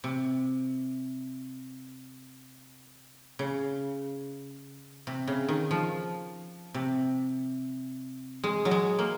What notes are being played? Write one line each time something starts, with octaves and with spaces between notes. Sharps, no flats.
C3
C#3
C3
C#3
D#3
F3
C3
G#3
F#3
G#3
A#3